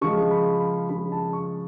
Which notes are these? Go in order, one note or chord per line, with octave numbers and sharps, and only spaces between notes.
C#3 F3 G#3 C#6
B5
B5
C#3 F3 G#3 B5
A5
C#6